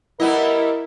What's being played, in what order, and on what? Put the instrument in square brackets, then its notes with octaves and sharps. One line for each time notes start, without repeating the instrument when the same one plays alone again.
[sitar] G3 B3 D#5 [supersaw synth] E4 [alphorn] A#4